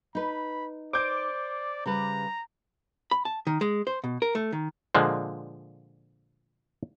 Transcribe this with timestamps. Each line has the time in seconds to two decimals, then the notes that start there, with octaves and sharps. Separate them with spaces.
0.15 D#4 B4 B5
0.93 C5 D5 D6 G6 D7
1.86 C#3 G3 B4 A#5
3.11 B5
3.25 A5
3.47 D#3
3.61 G#3
3.87 C5
4.04 B2
4.22 A#4
4.35 A3
4.53 D#3
4.95 A#2 D3 F3 G#3